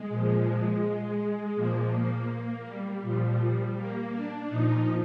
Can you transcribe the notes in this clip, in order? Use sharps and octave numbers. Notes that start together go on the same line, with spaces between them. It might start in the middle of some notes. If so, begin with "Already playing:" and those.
Already playing: G#3
A#2 F3
A#2 F3 A#3
A#3
A#3
G3
A#2 F3
A#3
D4
A#2 F3 D#4